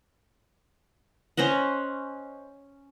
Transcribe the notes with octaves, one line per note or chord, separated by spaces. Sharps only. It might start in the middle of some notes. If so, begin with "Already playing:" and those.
C#4 C5 D#5 F#5